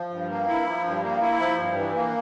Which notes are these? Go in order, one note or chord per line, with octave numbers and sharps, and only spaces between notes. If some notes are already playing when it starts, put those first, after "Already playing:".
Already playing: F3
G2
A#3
E4
F3
G2
A#3
E4
F3
G2
E3
A#3